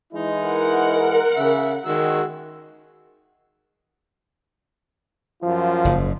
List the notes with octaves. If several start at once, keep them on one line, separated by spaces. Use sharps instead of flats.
E3 G#3 D#4 E4
A#4 F#5
C#3 E5
D#3 G#3 F#4 E6
F#2 F3 F4
F#1 G#2